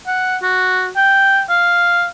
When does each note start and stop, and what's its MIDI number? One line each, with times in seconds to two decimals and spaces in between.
0.07 0.37 78
0.42 0.90 66
0.96 1.42 79
1.50 2.06 77